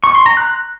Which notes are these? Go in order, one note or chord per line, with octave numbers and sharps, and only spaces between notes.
C#6
C6
A#5
F#6